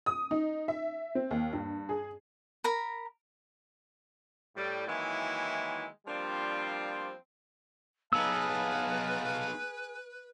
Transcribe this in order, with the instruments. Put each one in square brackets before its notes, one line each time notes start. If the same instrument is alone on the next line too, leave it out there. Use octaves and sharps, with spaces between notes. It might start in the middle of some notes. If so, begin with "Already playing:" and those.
[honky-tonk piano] D#6
D#4
E5
C4
D#2
G2
G#4
[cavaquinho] A#4 A#5 B5
[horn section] A2 G3
D#3 E3 F#3 G#3 A#3 E4
F3 G3 A#3 C4 D4 F4
[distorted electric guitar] B3 D#4 [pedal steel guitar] G#4 E6 [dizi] B4 [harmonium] F5 A5